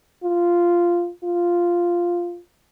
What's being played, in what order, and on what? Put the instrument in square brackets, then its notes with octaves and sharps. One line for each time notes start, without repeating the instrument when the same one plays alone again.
[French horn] F4
F4